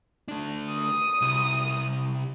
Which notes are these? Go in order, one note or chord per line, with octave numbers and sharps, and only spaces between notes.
A3 D4
D#6
C2